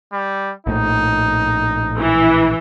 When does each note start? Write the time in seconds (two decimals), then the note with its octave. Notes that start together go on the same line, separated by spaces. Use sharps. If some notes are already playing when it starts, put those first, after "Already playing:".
0.13 G3
0.67 A#1 A2 D#4
1.98 E3